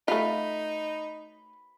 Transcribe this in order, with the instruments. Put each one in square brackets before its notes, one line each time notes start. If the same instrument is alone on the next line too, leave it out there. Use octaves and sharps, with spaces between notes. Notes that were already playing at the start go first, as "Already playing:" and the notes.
[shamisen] A3 F4 [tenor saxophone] D#4 [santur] B5